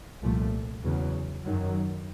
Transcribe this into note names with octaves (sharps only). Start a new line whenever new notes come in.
C2 A#2 F3 A3
E2 C#3 F#3
F#2 D#3 F#3